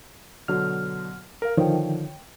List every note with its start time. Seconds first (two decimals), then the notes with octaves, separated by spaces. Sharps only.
0.48 B2 D3 F#3 F6
1.42 A#4 F5
1.57 D3 D#3 F3 C#5 G5